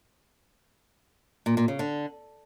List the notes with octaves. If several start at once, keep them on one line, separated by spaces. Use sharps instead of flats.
A#2
A#2
C#3
D3